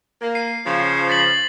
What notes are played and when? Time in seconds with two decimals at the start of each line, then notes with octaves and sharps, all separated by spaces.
0.22 A#3
0.35 C7 D#7
0.65 C#3 F3
1.09 A6 B6 F#7